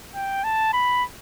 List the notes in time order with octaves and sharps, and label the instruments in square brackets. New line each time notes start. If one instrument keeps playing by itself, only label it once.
[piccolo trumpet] G5
A5
B5